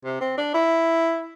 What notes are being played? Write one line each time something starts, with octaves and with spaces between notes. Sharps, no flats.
C3
C4
D4
E4